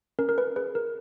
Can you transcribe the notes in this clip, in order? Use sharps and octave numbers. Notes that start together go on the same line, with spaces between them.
C#4 A#4
A#4
B4
G#4 B4
A#4